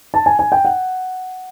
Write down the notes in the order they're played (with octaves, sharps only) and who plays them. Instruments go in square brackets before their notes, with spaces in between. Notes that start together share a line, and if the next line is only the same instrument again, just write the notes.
[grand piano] A5
G#5
G#5
G5
F#5